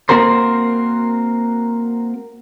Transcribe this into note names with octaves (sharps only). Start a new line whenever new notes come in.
A#3 C4 F#4 A#4 C5